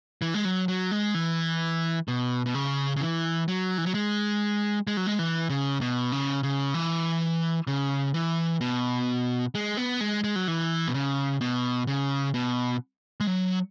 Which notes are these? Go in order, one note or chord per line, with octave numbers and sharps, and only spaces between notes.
E3
G#3
F#3
F#3
G#3
E3
B2
B2
C#3
C#3
E3
F#3
E3
F#3
G#3
G#3
F#3
G#3
E3
C#3
B2
C#3
C#3
E3
C#3
E3
B2
G#3
B3
G#3
G#3
F#3
E3
B2
C#3
B2
C#3
B2
G#3
F#3